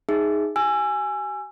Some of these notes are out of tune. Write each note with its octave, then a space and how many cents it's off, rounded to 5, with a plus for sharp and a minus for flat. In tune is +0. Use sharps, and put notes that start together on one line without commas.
D#4 +0 G#4 +0 E5 +0
G4 -45 G#5 +0 E6 +30